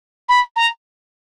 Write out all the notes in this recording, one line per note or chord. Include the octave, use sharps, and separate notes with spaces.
B5
A#5